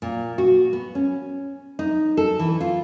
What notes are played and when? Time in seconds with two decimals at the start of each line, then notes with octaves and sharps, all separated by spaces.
0.02 A#2
0.38 F#4
0.73 B3
0.95 C#4
1.79 D#4
2.17 A4
2.39 E3
2.61 F4